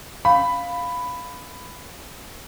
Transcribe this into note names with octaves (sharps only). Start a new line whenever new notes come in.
C#4 F5 B5